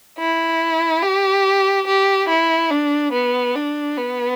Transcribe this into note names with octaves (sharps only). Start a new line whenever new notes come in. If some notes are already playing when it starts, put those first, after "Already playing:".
E4
G4
G4
E4
D4
B3
D4
B3